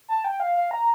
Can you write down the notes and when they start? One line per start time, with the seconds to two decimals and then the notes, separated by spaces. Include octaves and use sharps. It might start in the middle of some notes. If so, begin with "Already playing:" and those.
0.08 A5
0.24 G5
0.40 F5
0.55 F5
0.71 A#5